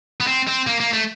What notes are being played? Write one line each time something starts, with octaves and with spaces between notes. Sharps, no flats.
B3
C4
C4
A#3
A#3
A3